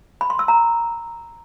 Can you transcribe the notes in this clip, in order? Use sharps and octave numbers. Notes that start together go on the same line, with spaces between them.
B5
C6
E6
A#5